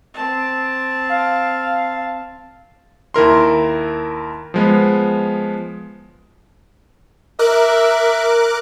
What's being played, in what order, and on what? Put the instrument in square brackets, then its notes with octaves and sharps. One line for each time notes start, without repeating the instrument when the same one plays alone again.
[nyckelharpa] C4 A5
[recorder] F5
[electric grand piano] D#2 E4 A#4 C6
F3 G#3 B3
[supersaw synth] A#4 D6 F#6 [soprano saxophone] E5